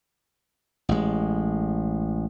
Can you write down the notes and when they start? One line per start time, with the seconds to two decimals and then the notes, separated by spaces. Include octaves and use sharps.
0.89 A1 G#3